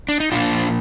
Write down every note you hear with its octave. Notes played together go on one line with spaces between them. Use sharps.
D4
D#4
A#2 F3 A#3 D4 F4